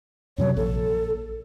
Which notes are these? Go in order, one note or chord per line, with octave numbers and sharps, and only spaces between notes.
F#2 C3 F#3 C#5
A#1 A4